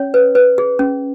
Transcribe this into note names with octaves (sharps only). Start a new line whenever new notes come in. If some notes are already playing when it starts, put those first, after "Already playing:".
Already playing: C#4 C#5
B4
B4
G#4
C#4